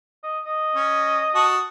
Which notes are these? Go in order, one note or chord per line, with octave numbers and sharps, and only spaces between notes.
D#5
D#5
C#4
F#4 A5 D#6